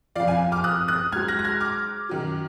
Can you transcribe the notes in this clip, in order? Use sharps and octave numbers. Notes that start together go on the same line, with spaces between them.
F2 F3 D5 F5
F5 G#5
D6 F6
D#6 F#6
D#6 F#6
G#2 F#3 F6 G#6
F#6 A#6
A#6
F6 G#6
D6 F6
F#2 D#3 F#3